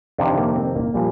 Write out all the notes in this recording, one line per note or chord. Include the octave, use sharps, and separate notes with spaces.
F2 C3 D#3 D4
A#3
C4
A#3
A#2 F3 G3